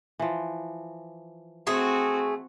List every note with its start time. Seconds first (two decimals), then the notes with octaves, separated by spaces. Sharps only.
0.19 E3 F3
1.67 A3 C4 F#4 G#4